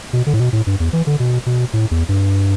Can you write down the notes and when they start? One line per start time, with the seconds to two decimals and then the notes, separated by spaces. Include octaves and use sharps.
0.13 B2
0.27 D3
0.34 A2
0.40 B2
0.53 A2
0.67 G2
0.80 E2
0.93 E3
1.07 D3
1.20 B2
1.46 B2
1.73 A2
1.91 E2
2.09 G2